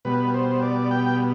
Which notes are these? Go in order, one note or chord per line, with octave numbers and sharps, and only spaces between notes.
B2 G3 B3 B4
C5
D5
G5